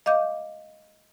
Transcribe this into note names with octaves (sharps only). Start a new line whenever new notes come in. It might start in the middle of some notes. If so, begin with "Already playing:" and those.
D#5 F5 D6 G6